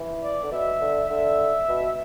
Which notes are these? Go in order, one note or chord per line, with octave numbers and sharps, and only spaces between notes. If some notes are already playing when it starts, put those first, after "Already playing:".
Already playing: E3
D5
D3
B2 E5
D3
D3 E5
B2